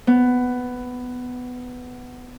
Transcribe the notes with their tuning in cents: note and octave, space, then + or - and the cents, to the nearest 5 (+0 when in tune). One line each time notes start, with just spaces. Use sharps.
B3 +10